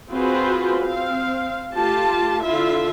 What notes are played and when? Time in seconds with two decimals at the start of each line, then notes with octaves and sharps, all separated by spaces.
0.10 C4 F4 F#4 G#4 B4 C5
0.80 C4 F5
1.74 A3 F4 G4 A5
2.41 D3 E4 F4 E5